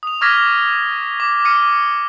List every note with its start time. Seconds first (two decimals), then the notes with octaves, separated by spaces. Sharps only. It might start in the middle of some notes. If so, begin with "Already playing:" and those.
0.03 D#6 F7
0.21 C#6 D6 F6 G#6 A#6 B6
1.20 D6
1.45 D6 F6 C#7 D#7